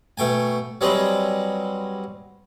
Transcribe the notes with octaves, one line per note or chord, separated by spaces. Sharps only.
B2 A3 G5 G#5
F#3 G3 C4 G#4 B4 D#5